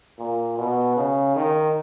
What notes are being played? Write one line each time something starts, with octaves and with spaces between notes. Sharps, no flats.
A#2
B2
C#3
D#3